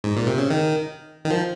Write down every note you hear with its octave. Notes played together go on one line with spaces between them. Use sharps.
G#2
A#2
C3
C#3
D#3
D#3
F3